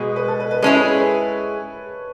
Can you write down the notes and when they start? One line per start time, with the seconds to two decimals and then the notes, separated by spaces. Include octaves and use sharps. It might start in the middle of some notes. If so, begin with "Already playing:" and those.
Already playing: B2 G#3 B4 D#5
0.16 B4
0.28 A4
0.40 B4
0.51 B4
0.63 G#3 C#4 E4 G#4 A4 C#5
0.75 A4 C#5
0.86 B4
0.98 B4